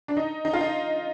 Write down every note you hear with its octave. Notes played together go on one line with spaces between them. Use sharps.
D4
D#4
D#4
F4
D#4